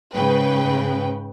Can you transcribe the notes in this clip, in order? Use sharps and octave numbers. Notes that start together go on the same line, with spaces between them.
G#2 C#3 B4 G5